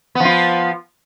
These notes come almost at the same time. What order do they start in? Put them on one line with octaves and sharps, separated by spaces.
B3 F3 F4